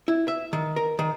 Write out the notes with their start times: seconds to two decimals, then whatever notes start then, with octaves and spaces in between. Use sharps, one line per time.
0.08 E4
0.28 E5
0.53 D#3
0.76 A#4
0.99 D#3